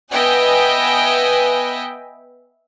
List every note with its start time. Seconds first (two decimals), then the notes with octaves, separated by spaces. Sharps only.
0.11 B3 B4 D#5 E5 G5 G#5